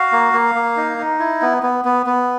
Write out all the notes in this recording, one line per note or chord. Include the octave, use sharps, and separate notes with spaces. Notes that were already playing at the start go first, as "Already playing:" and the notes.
Already playing: F#4 F5
A#3
A#3
A#3
D#4
D#4
E4
B3
B3
B3
B3